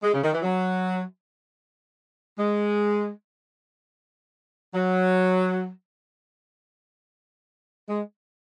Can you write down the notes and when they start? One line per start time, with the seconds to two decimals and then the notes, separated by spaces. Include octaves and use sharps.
0.03 G#3
0.14 C#3
0.24 D#3
0.33 E3
0.43 F#3
2.38 G#3
4.74 F#3
7.89 G#3